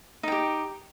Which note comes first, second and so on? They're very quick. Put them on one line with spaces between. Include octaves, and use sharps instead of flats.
D#4 G5 G4